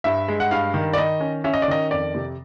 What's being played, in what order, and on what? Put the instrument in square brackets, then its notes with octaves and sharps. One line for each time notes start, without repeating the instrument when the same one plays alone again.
[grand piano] G2 E5
G#3
F#5
G2 F5
D#3
D5
D#3 D#5
C#4
C#4 E5
D#5
D5
D#3 D#5
F2 D5
C3